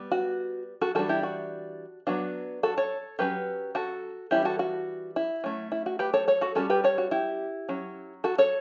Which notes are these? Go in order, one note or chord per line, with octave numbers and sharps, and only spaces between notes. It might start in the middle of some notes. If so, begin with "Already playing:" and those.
Already playing: G3 B3
F#4
F#4 A4
E3 G3 D4 F#4 A4
E4 G4
F#4
F#3 B3 D4 F#4
F#4 A4
A4 C#5
F#3 C#4 G4 B4
F#4 A4
E3 G3 C#4 E4 G4
F#4 A4
F#4
E4
F#3 A3 C#4
E4
F#4
G4 B4
A4 C#5
A4 C#5
F#4 A4
G3 C#4 F#4 A4
G4 B4
A4 C#5
F#4
E4 G4
F#3 C#4
F#4 A4
A4 C#5